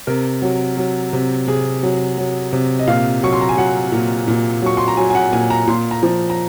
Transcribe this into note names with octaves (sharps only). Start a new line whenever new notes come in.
C3 A#4
F#3
F#3
C3
C3 G#4
F#3
F#3
C3
D#5
A#2 F5
F#3 C#6
C6
A#5
G#5
F#3 F#5
A#2
A#2
F#3 C#6
C6
A#5
F#3 G#5
G#5
F#5
A#2 G#5
A#5
A#2 C6
A#5
F3
A#5